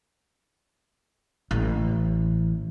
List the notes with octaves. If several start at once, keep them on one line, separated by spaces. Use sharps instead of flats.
A1